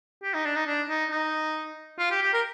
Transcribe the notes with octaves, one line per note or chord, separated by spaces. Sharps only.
G4
D#4
D4
D#4
D4
D#4
D#4
F4
G4
G4
A#4